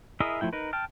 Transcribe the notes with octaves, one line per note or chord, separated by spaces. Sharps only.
E4 G#4 A#4 D#5 E5
F3 A3 E4 G5
D#4 A#4 B4
G5 A5 F6